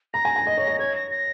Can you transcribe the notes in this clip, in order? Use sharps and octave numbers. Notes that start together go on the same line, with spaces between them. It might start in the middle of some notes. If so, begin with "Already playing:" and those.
A#5 A#6
G#5
G#5
D#5
C#5
D#5
C#5 G#6
A#6
A#6